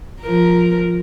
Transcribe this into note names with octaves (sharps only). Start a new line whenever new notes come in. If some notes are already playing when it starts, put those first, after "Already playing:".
F3 A#4